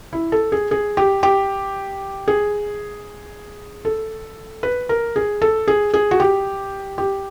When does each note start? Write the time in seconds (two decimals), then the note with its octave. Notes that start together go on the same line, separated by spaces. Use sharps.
0.13 E4
0.32 A4
0.52 G#4
0.71 G#4
0.97 G4
1.23 G4
2.28 G#4
3.85 A4
4.63 B4
4.89 A#4
5.16 G#4
5.42 A4
5.68 G#4
5.94 G#4
6.11 F#4
6.20 G4
6.98 G4